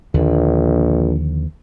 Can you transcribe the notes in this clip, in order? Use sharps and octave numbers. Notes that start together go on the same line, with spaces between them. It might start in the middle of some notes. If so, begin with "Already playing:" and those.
A#1 D#2 D3 F3